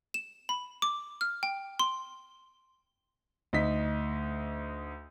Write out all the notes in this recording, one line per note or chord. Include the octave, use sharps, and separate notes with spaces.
E7
B5
D6
F6
G5
C6
D2 D#4 B6